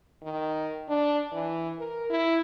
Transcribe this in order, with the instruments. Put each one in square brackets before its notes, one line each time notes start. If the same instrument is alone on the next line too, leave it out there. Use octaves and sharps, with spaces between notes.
[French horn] D#3
D4
E3
A#4
E4